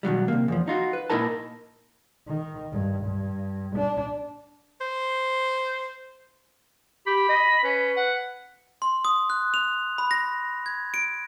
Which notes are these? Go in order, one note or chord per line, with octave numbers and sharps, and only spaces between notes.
B2 D#3 F#3 G3
C3 A#3
E2 F3
D#4 F4 F#4
B4
A#2 C4 D#4 E4 A#4 A5
D#3
G2
G2
D4
C5
G4 B5
D#5
C#4 B4
F#5
C6
D#6
F#6
F7
B5
A#6
G#6
D7